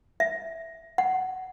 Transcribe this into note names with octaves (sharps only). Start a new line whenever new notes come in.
E5
F#5